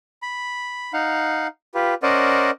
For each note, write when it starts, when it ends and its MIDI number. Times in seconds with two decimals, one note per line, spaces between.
0.22 0.93 83
0.93 1.47 63
0.93 1.47 77
0.93 1.47 78
1.75 1.94 65
1.75 1.94 67
1.75 1.94 71
2.03 2.51 61
2.03 2.51 70
2.03 2.51 72
2.03 2.51 74
2.03 2.51 75
2.03 2.51 78